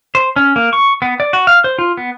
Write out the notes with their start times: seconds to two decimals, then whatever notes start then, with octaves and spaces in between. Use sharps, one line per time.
0.15 C5
0.36 C#4
0.56 A#3
0.73 C#6
1.02 B3
1.20 D5
1.33 F#4
1.47 F5
1.64 C5
1.79 F4
1.97 B3